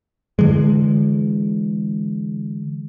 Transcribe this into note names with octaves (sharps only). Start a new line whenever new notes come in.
D3 E3 G#3